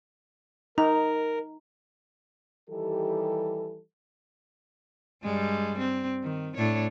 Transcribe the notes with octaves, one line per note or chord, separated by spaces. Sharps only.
D#4 A#4 A#5
D#3 E3 G3 G4 A4
G2 G3 G#3
C4
D#3
A2 D4 C#5